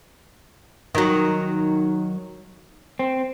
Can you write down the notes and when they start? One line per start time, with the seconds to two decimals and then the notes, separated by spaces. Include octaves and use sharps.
0.95 D#3 F#3
2.99 C4